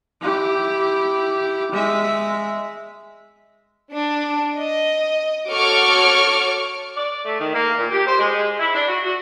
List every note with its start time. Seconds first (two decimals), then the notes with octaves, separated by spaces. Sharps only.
0.21 E4 G4
1.72 G#3 E5
3.92 D4
4.58 D#5
5.50 F#4 A4 C#5 C#6 D6 F6
6.97 D5
7.25 A3
7.39 D#3
7.54 A#3
7.78 A#2
7.91 G4
8.06 C5
8.19 G#3
8.60 E4
8.74 D4
8.88 F#4
9.03 F#4